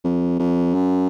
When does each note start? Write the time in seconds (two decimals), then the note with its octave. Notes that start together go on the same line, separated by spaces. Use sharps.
0.04 F2
0.39 F2
0.74 F#2